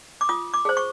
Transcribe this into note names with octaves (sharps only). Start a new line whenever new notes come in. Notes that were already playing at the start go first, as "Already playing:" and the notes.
D6
F4 D#6
D6
G#4 C5
C#6